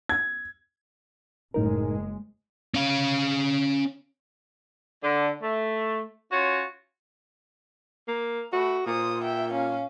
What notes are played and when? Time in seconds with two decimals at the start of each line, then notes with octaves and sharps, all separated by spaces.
0.09 G#6
1.54 F#1 A2 G#3 D#4 A#4
2.74 C#4 F5
5.03 D3
5.42 A3
6.32 C#4 F4 F#4 C#5
8.08 A#3
8.53 A3 F#4 B5
8.87 A#2 C5 D#6
9.23 E5 G5
9.53 C#4 F5